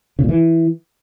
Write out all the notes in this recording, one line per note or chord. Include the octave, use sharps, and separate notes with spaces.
C#3
A#2
E3